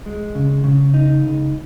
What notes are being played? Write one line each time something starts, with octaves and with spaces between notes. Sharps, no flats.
G#3
C#3
C#3
D#4
C#2